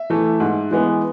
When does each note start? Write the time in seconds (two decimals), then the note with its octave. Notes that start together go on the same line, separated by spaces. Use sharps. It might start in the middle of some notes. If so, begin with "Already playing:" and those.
Already playing: E5
0.10 E3 A3
0.40 G#2
0.71 E3 G#3 B3